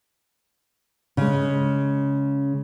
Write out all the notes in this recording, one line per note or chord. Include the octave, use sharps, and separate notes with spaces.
C#3 G#3